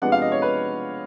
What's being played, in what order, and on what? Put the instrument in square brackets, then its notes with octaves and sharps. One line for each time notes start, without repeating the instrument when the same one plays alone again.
[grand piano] C3 F3 G#3 B3 D4 F#5
F5
D#5
C#5
B4